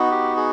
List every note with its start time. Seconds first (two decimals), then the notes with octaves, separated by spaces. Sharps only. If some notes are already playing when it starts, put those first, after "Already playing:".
Already playing: B3 D#4 F#4
0.11 G4
0.36 G#4